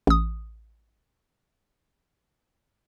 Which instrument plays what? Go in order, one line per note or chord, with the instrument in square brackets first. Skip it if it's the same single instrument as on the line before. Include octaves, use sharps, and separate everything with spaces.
[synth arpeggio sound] A1 D#6